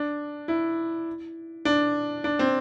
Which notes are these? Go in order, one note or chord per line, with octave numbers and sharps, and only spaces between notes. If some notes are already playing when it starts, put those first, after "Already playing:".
Already playing: D4
E4
D4
D4
C4